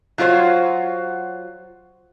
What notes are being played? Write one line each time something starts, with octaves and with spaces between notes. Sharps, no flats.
F#3 F4 F#4 C5 C#5